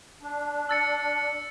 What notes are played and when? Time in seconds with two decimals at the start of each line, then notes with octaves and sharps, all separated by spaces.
0.21 D4
0.69 E6 A6 C#7